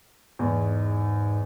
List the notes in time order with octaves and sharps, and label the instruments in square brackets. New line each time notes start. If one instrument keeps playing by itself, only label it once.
[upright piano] E2 [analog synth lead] G#2